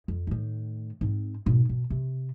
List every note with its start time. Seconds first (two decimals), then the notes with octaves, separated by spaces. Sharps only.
0.08 F2
0.27 A2 D#3
1.01 G#2 C4
1.46 G#2 B2
1.69 B2
1.90 C3